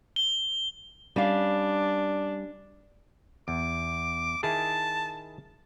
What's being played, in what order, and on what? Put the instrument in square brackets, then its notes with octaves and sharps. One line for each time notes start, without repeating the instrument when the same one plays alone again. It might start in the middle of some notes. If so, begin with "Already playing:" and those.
[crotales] G7
[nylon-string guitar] G3 C#4 F5 [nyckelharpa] D4
[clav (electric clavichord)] E2 [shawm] D6
[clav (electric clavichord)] D#3 E4 G#4 [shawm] A5